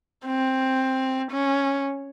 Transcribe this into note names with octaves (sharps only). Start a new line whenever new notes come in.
C4
C#4